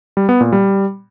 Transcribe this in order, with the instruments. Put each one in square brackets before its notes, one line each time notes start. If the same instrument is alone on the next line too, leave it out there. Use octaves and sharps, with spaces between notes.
[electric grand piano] G3
B3
A#2
G3